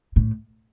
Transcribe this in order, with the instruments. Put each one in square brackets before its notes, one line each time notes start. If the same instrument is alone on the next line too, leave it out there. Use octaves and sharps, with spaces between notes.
[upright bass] A2